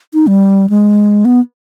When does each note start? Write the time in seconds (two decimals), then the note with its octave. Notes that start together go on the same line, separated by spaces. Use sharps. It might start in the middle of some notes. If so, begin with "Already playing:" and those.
0.14 D#4
0.27 G3
0.70 G#3
1.25 B3